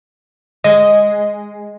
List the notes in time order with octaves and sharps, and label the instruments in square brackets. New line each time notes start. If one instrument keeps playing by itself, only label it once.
[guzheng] G#3 [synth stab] D#5